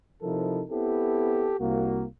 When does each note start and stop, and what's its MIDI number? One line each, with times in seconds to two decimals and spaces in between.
0.23 0.63 48
0.23 0.63 53
0.23 0.63 63
0.23 0.63 64
0.23 0.63 69
0.23 0.63 70
0.70 1.54 59
0.70 1.54 60
0.70 1.54 64
0.70 1.54 67
0.70 1.54 69
1.60 2.04 36
1.60 2.04 58
1.60 2.04 66